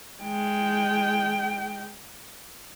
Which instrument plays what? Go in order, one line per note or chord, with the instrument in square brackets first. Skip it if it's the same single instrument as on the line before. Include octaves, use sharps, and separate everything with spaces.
[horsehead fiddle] G#3 G5